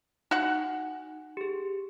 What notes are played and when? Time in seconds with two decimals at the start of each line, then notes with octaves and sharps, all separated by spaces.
0.31 D#4 F#4 F#5
1.37 G4 G#4